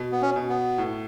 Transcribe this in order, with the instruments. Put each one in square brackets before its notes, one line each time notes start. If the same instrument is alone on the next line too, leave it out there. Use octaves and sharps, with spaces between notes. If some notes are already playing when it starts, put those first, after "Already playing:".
Already playing: [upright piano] B2
[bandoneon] B3
C#4
[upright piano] B2
[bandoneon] B3
[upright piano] A2